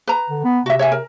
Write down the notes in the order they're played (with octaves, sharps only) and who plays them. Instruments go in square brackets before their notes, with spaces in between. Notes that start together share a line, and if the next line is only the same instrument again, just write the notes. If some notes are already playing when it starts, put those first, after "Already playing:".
[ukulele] B4 A#5
[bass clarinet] D3
B3
[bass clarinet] C3 [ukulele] F#4 E5
[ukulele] C#5 E5 G#5
A#4